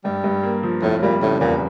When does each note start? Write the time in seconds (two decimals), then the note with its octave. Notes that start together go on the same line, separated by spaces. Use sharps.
0.04 G2 G3
0.24 G2
0.43 A#3
0.63 F3
0.82 F1 A2
1.02 A#2 G3
1.21 A2 C#3
1.40 E2 A#2